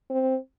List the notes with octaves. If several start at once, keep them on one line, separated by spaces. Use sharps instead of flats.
C4